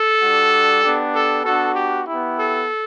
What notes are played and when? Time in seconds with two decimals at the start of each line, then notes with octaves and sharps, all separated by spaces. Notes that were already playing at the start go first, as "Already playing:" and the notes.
Already playing: A4
0.21 G3 D4 F#4
0.82 B3 D4 G4
1.13 A4
1.43 B3 D4 F#4 A4
1.75 G4
2.05 B3 E4 G4
2.36 A4